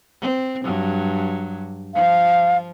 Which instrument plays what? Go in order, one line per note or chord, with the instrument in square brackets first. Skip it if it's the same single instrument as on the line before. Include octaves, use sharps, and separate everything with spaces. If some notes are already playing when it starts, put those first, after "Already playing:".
[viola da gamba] C4
G2 F#3
[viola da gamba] F3 [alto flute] F5